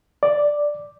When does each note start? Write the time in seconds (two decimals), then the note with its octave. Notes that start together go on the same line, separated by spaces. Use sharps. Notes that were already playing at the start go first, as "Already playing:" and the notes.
0.23 D5